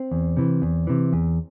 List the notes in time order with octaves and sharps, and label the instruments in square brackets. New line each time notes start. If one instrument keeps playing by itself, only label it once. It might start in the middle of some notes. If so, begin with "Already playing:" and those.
Already playing: [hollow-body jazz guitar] C4
E2
C3 E3
E2
C3 E3
E2